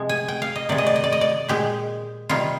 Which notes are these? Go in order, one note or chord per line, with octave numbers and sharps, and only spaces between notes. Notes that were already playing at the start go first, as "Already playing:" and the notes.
Already playing: C3 F3 G#3
G#5
G5
F5
D#5
C3 D#3 G#3 D5
D#5
D5
D#5
D5
D#5
D5
A#2 G#3 G4
C3 D#3 G3 F4